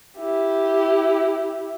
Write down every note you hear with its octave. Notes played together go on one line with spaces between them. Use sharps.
E4 G4